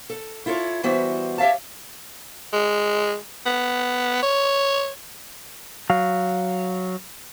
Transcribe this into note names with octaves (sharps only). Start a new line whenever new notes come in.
A4
E4 F4 A4 C#5
E3 G3 B3 F#4 C5 E5
G4 C#5 E5 F5 A5
G#3
B3
C#5
F#3 F5